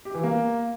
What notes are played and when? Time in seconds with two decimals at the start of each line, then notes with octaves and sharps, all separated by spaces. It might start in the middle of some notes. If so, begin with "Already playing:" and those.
0.05 G4
0.14 E3
0.23 A#3